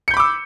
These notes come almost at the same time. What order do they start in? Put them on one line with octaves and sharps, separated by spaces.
C#7 G6 B5 D6 E6